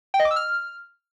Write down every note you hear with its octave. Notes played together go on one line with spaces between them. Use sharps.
G5
D#5
D6
E6
F6